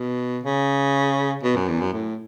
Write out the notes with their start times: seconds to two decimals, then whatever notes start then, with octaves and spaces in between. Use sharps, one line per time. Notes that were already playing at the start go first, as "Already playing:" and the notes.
Already playing: B2
0.43 C#3
1.44 B2
1.56 F#2
1.68 E2
1.81 F#2
1.93 A2